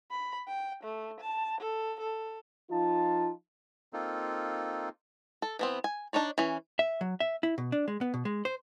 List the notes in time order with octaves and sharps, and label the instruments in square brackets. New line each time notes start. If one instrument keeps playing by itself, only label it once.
[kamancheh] B5
G5
A3
A5
A4
A4
[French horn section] F3 D#4 F4 [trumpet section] A5
[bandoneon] A#3 C4 D#4 F4 A4
[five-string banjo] A4
E3 B3 C4
G#5
D4 D#4 C#5 D5
E3 C#4
[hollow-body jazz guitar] E5
F#3
E5
E4
B2
D4
G#3
B3
B2
G#3
C5